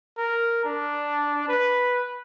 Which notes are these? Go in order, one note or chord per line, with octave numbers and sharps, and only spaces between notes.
A#4
D4
B4